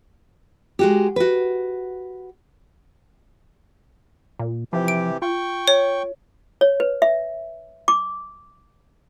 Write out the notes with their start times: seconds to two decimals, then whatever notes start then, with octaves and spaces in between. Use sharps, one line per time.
0.79 G#3 F#4 G4
1.16 F#4 B4
4.39 A#2
4.73 C3 E3 F3 G4
4.88 D7
5.22 F4 G5 C#6
5.68 C#5
6.61 C#5
6.80 B4
7.02 E5
7.88 D6